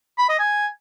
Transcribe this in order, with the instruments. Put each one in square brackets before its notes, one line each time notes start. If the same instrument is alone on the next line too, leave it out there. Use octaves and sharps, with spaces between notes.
[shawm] B5
D#5
G#5